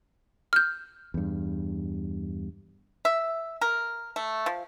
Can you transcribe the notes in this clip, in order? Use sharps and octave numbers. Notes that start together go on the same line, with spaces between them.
F6 G6
E2 G2
E5
A#4
A3
F3